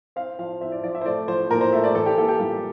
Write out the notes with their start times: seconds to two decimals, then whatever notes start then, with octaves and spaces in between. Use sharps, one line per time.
0.16 C4 F5
0.39 F3 F5
0.61 C4 E5
0.72 D5
0.83 F3 D5
0.95 E5
1.01 C5
1.06 A3 D5
1.28 F3 C5
1.50 A#2 A#4
1.61 C5
1.73 A3 E5
1.84 D5
1.95 E3 A4
2.06 G4
2.17 A#3 A4
2.28 G4
2.40 G3 F4